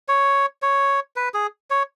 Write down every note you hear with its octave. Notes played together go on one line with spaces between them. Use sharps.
C#5
C#5
B4
G#4
C#5